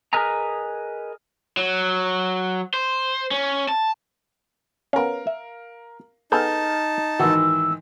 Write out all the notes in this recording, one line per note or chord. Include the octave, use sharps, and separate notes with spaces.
G#4 A#4 B4 D#5 G#5 A#5
F#3
C5
C#4
A5
B3 C#4 A#4 F5
E5
B3 D#4 G#4 A4 A5 F6 G6
G#2 D#3 E3 F#4 E6